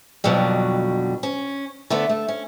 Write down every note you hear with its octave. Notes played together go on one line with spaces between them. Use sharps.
F2 B2 D3 F#3 G3
C#4
D3 A3 B3
A3
C#4